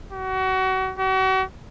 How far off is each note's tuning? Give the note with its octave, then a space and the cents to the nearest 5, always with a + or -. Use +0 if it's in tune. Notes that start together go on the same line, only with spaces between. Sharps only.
F#4 +30
F#4 +40